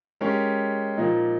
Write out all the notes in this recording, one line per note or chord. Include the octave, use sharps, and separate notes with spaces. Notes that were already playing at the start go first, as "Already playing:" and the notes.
G#3 C#4 G4 A#4
A#2 F3 A#3 D#4